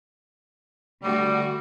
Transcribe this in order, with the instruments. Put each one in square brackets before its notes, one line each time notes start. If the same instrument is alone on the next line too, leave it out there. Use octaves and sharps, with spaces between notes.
[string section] D3 A3 F#4 [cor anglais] G3